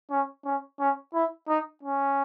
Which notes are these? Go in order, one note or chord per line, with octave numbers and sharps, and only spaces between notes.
C#4
C#4
C#4
E4
D#4
C#4